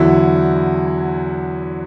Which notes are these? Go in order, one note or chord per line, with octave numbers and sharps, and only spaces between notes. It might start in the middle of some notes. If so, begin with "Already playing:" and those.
Already playing: E2 D3 F#3 E4